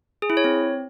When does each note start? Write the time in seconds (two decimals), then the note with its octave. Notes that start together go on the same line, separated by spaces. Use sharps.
0.22 G#4
0.30 E4
0.37 C#5
0.44 C4